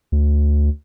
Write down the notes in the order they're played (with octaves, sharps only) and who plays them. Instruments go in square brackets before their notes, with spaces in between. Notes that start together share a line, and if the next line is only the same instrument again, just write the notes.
[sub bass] D2